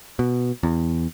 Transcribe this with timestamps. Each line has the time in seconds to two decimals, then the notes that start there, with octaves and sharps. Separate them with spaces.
0.19 B2
0.63 E2